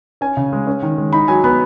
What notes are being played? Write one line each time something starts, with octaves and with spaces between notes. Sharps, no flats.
C#4 G#5
C#3
G#3
C#4
D#3
G#3
D#4 B5
F#3 G#5
B3 B5